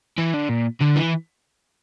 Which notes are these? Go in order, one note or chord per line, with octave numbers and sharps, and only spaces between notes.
E3
D3
A#2
D3
E3